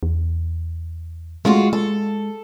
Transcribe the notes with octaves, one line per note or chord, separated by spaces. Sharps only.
E2
G#3 A3 F4 F#4
G#3 A4